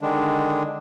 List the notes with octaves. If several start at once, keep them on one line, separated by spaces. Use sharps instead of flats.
D3 D#3 G#3 D4